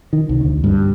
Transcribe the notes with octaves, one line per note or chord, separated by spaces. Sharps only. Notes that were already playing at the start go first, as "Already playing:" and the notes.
D#3
C2
D2
G2